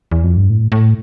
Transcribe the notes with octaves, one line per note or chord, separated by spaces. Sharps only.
E2
F2
G2
A2
A2